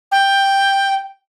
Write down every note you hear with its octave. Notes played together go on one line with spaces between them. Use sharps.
G5